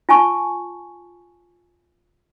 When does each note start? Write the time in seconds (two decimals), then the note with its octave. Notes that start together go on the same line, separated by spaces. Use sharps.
0.09 F4 G#5 A5 C#6